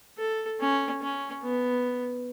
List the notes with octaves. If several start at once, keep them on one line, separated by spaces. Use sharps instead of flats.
A4
C#4
C#4
B3